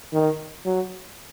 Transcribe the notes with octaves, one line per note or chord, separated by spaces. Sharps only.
D#3
F#3